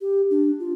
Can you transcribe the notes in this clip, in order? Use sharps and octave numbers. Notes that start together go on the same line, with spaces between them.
G4
D4
F4